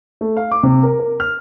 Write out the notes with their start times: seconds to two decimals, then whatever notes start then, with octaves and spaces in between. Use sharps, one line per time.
0.21 A3
0.37 F5
0.51 D6
0.63 C3
0.83 A#4
1.00 A#4
1.20 F6